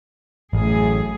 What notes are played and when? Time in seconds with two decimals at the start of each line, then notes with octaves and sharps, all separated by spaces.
0.53 A1 F#2 A2 G#4